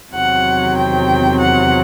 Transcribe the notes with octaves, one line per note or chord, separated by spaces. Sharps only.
E2 C3 D#3 F#3 C4 F#5
G5
F#5